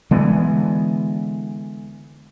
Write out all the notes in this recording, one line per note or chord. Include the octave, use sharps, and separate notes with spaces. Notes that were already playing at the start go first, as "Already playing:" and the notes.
D3 E3 G#3 B3